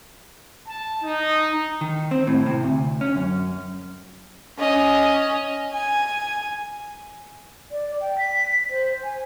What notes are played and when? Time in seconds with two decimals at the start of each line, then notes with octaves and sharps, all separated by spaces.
0.67 A5
1.02 D#4
1.81 D#3
2.11 C4
2.27 A2
2.46 C3
2.63 D2
3.01 C#4
3.16 F#2
4.59 C#4 D#5
5.73 G#5
7.71 D5
8.01 G5
8.18 B6
8.70 C5
9.03 G#5